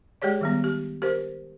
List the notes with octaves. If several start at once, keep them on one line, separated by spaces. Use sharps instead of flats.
G#3 G4 G#4 C#5 D5
D#3 G3 B3
G4
G4 A#4 C5